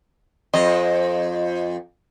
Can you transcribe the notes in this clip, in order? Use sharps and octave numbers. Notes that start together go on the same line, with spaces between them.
F2 D#5